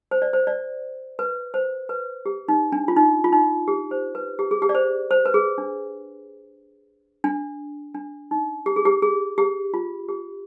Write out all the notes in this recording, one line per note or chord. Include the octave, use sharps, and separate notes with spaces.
C5
D5
C5
D5
B4
C5
B4
G4
D#4
D4
F4
D#4
F4
D#4
G4
C5
B4
G4
G#4
G4
D5
C5
C5
B4
G#4
D4
D4
D4
D#4
G4
G#4
G4
G#4
G4
F4
G4